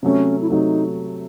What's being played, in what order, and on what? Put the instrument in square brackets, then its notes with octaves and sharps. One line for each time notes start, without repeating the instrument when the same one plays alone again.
[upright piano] C3 F#3 A3 [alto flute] C#4
[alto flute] E4
[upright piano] C3 F#3 A3 [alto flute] D#4